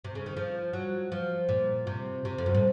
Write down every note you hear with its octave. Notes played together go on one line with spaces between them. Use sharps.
C3
C#3
D#3
F3
F#3
F3
A#2
C3
C3
F2
F#2
A2